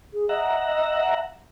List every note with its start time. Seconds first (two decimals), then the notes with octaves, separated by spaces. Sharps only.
0.14 G#4
0.29 D#5 E5 F#5 A#5